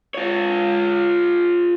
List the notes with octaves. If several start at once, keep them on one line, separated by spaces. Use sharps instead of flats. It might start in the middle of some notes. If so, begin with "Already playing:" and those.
F4 C#5